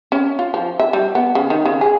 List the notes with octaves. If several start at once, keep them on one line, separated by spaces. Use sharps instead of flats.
C#4
F4
F3
E5
G3
B3
C#3
D#3
C#3
G#4